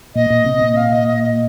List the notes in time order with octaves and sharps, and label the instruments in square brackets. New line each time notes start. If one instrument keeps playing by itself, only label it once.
[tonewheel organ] A#2 [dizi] D#5
[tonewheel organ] A#2
C3
A#2
[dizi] F5
D#5
D#5
D#5